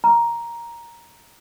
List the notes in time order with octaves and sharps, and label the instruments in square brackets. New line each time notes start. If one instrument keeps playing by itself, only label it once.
[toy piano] A#5